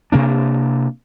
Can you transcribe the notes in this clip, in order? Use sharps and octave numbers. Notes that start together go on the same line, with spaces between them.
C3 A#3 D4